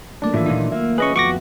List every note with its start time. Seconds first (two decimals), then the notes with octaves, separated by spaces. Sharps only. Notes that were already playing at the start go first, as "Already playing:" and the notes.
0.22 F#3 A3 A#3 D4 D5
0.34 A2 D#3 E3 F4 E5
0.46 A#2 E3 D#4
0.72 A#3 E5
0.98 C#4 G#4 B4 D#5 C#6
1.16 F2 B3 F#4 C#6 D6 A#6